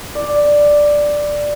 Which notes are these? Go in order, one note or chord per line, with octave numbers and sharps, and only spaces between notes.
D5